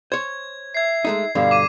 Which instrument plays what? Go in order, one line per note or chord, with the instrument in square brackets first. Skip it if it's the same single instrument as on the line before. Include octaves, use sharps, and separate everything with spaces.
[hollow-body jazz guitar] C5 C#5 [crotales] G#6
[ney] E5 [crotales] G#6 C7
[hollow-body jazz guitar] G#3 A3 D#4
[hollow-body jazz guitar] G2 B2 D3 [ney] F5
[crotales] D6 D#7